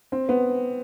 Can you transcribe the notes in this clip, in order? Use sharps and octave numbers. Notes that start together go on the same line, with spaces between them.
C4
B3